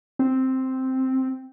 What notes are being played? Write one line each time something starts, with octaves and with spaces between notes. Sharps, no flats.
C4